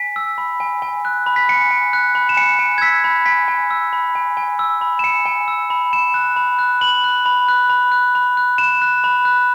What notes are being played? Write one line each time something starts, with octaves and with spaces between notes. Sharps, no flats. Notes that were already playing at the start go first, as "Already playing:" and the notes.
Already playing: G#5 B6
E6
B5
G#5
G#5
F#6
B5
B6
G#5 C#7
G#5
F#6
B5
E7
G#5 C#7
G#5
G#6
E6 B6
B5
G#5 B6
G#5
E6
B5
G#5
G#5
E6
B5
E7
G#5 C#7
G#5
E6
B5
B5 E7
F#6
B5
F#6
B5 F#7
F#6
B5
F#6
B5
F#6
B5
F#6
B5 E7
F#6
B5
F#6